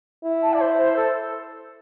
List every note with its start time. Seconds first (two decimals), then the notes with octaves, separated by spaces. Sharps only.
0.24 E4
0.42 A5
0.53 D5
0.60 C5
0.79 C5
0.96 A4